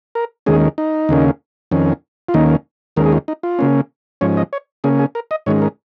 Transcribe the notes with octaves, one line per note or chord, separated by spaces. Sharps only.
A#4
D#2 D#3 G#3 C#4 G#4
D#4
D#2 C#3 A#3 C#4
F2 D#3 C#4
F4
D#2 D#3 A#3 C#4 D#4
D#2 D#3 G#3 C#4 A#4
G#4
F4
D#4
F4
C#3 A#3 C#4
G#2 F3 C#4 C#5
D#5
C#5
C#3 A#3 C#4 G#4
G#4
A#4
D#5
G#2 D#3 G#3 C#4 C#5
A#4